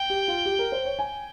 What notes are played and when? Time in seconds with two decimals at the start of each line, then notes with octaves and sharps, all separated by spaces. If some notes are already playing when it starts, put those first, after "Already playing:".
Already playing: G5
0.10 G4
0.28 F4
0.46 G4
0.59 A#4
0.72 C5
0.85 C#5
0.99 G#5